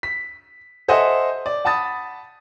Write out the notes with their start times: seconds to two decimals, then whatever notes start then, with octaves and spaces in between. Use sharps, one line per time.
0.03 B6
0.88 A4 C5 D#5 E5 F#5 G#5
1.46 D5
1.65 F#5 A5 B5 D#6 A6